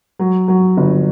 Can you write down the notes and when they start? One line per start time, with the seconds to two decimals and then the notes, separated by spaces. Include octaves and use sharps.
0.19 F#3
0.48 F#3
0.77 G1